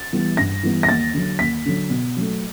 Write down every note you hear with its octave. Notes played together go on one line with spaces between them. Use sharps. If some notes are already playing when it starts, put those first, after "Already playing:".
Already playing: A6
E3 G3 B3
G2 A#6
E3 G3 B3
A#6
D#2 A6
D3 F#3
D#2 B6
D3 F#3
B2
F#3 A3